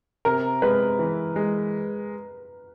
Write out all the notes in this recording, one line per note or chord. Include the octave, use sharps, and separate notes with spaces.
C3 A#4
G#3 B4
E3
G#3